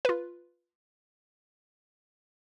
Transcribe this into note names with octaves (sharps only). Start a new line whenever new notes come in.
F4 B4